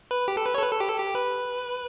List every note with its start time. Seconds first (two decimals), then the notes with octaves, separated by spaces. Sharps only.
0.11 B4
0.28 G4
0.37 A4
0.46 B4
0.54 C#5
0.58 A4
0.62 B4
0.72 A4
0.80 G4
0.89 A4
0.98 G4
1.15 B4